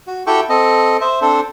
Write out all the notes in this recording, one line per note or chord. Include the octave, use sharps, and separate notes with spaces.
F#4
E4 F#4 G4 A4 G5 C#6
C4 A4 D#5
C5 E5
C4 D4 A4 C5